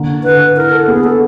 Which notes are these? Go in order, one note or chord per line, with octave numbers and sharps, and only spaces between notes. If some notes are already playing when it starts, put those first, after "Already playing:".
Already playing: D3 A#3
D3 B4
E4 A#4
A4
B3 G#4
A4